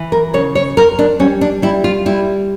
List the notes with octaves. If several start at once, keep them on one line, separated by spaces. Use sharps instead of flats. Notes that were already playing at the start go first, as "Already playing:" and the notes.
Already playing: E3
A#4
C#3 C#5
C#5
F2 A#4
D4
G3 C#4
D4
G3 E4
F4
G3 E4